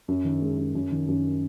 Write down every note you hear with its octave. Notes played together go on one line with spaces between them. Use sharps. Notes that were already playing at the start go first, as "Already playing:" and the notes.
F#2
D#3
G#3
F#2
F#2
D#3
F#2